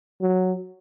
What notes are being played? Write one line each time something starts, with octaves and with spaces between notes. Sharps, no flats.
F#3